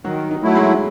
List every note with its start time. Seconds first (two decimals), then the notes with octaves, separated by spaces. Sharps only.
0.04 D#3 F#3 F#4
0.31 D#4
0.43 F#3 A3 E4
0.55 G#3 G#4